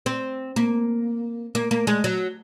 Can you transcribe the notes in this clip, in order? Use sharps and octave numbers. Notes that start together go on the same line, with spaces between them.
C4
A#3
A#3
A#3
G#3
F#3